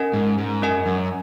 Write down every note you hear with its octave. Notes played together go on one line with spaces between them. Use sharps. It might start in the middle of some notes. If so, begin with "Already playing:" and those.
Already playing: C#4 A#4 D#5 G#5
G#2
G#2
F#2 C#4 A#4 D#5 G#5
F#2